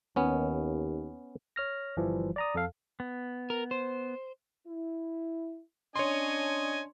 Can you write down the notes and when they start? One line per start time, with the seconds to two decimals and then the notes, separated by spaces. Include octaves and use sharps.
0.16 D#2 B3 C#4
1.56 C#5 F6 A#6
1.97 G1 E3 F3 G3
2.36 D5 A#5 D#6
2.55 F2 A4 F5
3.00 B3
3.50 A#4
3.71 C5
4.67 E4
5.96 C#4 D4 C#5 D#5 G#5 C6